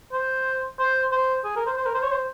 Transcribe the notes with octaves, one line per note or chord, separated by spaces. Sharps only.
C5
C5
C5
G#4
A#4
C5
C5
A#4
C5
C#5
C5